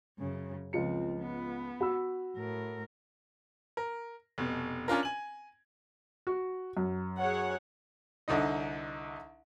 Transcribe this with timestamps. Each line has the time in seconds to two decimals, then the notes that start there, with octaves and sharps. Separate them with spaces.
0.18 F#2 C#3
0.73 C#2 F3 C4 F4 C#7
1.19 B3
1.80 F#4 B5 E6
2.36 A2 A#4
3.77 A#4
4.38 F1 B2
4.88 C#4 D4 F4 A#4
5.03 G#5 F#7
6.27 F#4
6.77 F#2
7.19 G#4 C#5 F#5
8.28 C2 D3 D#4 D#5